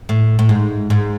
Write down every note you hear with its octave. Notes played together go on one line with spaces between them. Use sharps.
A2
A2
G#2
G#2